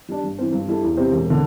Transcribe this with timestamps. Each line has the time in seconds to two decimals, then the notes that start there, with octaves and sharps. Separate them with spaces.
0.09 G3 D4
0.23 G2
0.38 E3 C4
0.53 G2
0.68 G3 E4 A4
0.83 E2
0.97 C3 G3 C4
1.11 E1
1.30 D3